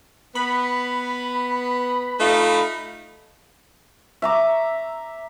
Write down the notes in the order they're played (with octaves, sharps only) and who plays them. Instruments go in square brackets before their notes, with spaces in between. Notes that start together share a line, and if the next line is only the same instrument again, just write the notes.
[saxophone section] B3 [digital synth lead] B5
[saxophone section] A3 D#4 F4
[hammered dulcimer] E5 A#5 D6